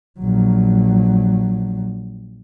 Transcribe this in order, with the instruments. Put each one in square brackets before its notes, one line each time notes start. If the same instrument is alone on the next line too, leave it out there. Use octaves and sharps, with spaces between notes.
[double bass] A#1 F#3